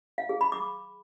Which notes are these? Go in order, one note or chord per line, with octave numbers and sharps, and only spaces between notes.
F5
G#4
B5
D6